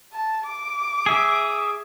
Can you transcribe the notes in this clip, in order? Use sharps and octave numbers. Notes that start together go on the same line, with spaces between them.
A5
D6
G#4 E5